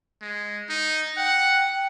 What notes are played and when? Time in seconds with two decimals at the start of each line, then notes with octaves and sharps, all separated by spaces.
0.22 G#3
0.69 D#4
1.17 F#5 G5